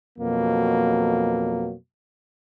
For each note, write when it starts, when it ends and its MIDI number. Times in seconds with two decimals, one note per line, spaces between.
0.19 1.74 41
0.19 1.74 47
0.19 1.74 54
0.19 1.74 58